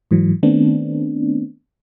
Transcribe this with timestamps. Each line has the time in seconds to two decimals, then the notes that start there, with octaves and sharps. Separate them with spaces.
0.11 G#2 E3 F#3
0.43 D#3 A3 B3 C4 D4